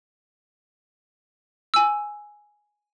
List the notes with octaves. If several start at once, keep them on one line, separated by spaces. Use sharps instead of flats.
G#5 E6